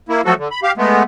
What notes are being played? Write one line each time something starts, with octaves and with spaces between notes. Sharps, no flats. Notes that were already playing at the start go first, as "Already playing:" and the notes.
A#3 E4
F3 F#3 A3 F#4 A4
D3
B5
G4 F5
G#3 A3 B3